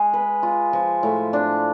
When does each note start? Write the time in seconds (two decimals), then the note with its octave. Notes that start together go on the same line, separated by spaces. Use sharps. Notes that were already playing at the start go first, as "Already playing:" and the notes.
Already playing: G#3 G#4
0.13 B4
0.43 F4
0.73 F3
1.03 A2
1.33 D4